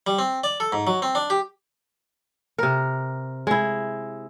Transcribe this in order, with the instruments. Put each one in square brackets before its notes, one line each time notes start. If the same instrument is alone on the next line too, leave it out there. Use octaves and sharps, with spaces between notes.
[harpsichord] G3
C4
D5
A4
G#2
F#3
C4
D4
G4
[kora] C3 A#4
G#3 E4